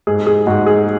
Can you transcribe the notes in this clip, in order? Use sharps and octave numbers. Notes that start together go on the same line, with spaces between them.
G#2 G#4
G#4
G#2 F#4
G#4